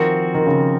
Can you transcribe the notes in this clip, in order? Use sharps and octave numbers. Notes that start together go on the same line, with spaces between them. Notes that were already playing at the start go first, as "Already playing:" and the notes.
Already playing: D#3 F3 C4 F#4
D#3
C#3